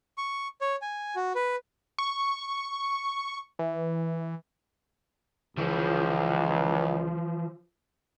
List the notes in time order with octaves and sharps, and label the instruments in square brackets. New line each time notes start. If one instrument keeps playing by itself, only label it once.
[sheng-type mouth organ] C#6
C#5
G#5
F#4
B4
[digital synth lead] C#6
E3
[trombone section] C#2 [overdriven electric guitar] E3 F3